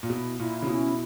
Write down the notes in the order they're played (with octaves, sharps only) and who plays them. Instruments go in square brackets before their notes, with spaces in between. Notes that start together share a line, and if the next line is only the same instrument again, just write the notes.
[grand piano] A#2
[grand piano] B2 [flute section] E4
[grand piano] A#2 [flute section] E4
[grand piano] C#3
[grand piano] B2 [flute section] C#4